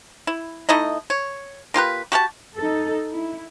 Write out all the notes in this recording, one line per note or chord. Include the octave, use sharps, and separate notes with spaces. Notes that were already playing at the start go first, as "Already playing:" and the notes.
E4
A3 D#4 E4 D#5
C#5
A#3 F4 G4 B4
F#4 G4 A#4 A5
D#4 A4
E4